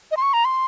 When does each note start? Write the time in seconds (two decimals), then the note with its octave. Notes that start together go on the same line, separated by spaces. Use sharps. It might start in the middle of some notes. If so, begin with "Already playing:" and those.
0.11 D#5
0.17 C6
0.22 C#6
0.33 A#5
0.45 C6